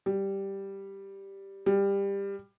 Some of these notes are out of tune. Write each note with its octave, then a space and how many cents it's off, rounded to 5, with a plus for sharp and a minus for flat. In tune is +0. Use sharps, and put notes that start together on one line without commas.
G3 +0
G3 +20